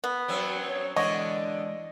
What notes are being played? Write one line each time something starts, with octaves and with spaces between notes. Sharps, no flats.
B3
F#2 F#3 C4
C#5
D3 E3 G#3 B3 D4 C#5 D#5